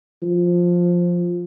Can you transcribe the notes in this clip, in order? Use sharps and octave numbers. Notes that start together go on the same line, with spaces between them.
F3